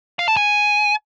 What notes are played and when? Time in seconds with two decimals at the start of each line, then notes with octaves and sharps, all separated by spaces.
0.19 F5
0.28 A5
0.37 G#5